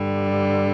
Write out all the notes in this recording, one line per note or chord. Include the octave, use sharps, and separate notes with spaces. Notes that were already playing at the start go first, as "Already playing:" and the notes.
Already playing: G2 D3 G3